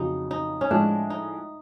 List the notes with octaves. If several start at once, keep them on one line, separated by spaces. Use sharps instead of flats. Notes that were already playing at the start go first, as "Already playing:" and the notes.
Already playing: F2 C#3 F#3 D#4
D#4
C#4
A2 F3 G#3 D4
D#4